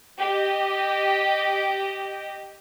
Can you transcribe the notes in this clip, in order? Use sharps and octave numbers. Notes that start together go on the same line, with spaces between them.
G4 D#5